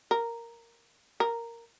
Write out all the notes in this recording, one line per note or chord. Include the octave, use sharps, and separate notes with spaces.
A#4
A#4